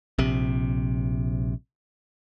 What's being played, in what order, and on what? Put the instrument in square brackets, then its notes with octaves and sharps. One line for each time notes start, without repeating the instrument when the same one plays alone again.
[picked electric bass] A#1 C3